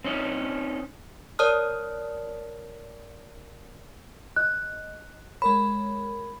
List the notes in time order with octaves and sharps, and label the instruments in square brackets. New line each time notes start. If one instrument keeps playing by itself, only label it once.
[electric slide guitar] C4 C#4 D#4
[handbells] A#4 C#5 D5 A5 D#6 F6
[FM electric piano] D#5 [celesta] F#6
[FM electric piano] G#3 A#4 C#5 [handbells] B5